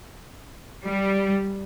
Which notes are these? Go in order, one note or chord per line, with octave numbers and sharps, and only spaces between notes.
G3